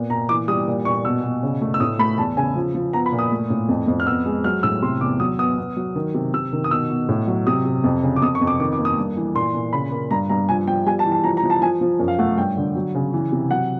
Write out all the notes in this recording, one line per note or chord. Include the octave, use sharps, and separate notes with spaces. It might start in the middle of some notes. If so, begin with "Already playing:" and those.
Already playing: A#2 B3
A#2 A#5
E3 D6
G3 D#6
A#2
A#2 C#6
B2 E6
B2
C#3
A3
E6
A2 D#6
A3 B5
E2 A5
C#3 G#5
F3
F3
B3 A#5
B5
A#2
D#6
A3
A2
F2
F2
F6
B3 E6
G#3
F#3 F6
A2 E6
C3 C6
E2 D6
F#3 D#6
B3 D#6
B3
F#3
D#3
C3
C3 E6
D#3
D#6
B2 E6
B2
A2
F#3
C3 D#6
C3
F2
C#3
D6
F2 D#6
C#6
F2
D6
D#3 D6
D6
A#3
D#6
G2
E3
A#2 C6
A#2
C#3 B5
A#3
G2 A#5
G2 A#5
F3 G#5
F3 G5
G3 G#5
A5
E3
A5
F3 A#5
A#5
F3
A5
F3 G#5
F3
F#2
F5
A3 F#5
G2 G5
D3
F#3
C#3
E3
C3
F#3 F#5